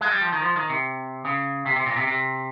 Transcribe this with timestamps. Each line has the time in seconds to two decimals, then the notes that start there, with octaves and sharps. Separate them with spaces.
0.01 G#3
0.11 G3
0.21 F3
0.33 D#3
0.42 F3
0.56 D#3
0.69 C3
1.25 C#3
1.66 C3
1.76 C3
1.86 A#2
1.96 C3
2.07 C3